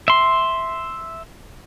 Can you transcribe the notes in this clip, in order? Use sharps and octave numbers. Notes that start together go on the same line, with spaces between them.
E5 C6